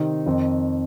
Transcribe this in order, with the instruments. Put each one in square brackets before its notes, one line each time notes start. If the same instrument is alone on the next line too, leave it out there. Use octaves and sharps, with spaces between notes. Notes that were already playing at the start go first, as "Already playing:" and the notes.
Already playing: [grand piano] C3 D#3 C4 D#4
F2 D#3 C4